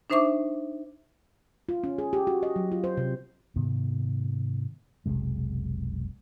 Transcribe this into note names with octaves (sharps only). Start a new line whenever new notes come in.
D4 D#4 C5 E5 C#6 D6
F4
C#4
G#4
G4
F#4
D#5
F#3
F4
C5
C3
G#2 C3 D#3 B3
F1 B1 C3 G#3